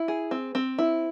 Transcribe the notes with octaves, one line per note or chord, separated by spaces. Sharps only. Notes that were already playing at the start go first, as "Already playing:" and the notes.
Already playing: E4
G#4
C4
C4
E4